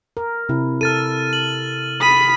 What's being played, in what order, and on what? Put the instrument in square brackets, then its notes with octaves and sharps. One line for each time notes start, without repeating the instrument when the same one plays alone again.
[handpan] A#4
C3 E4
[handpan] A4 [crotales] F6 A6 D#7
[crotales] F#7
[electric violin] B5 B6 [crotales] D#6 D#7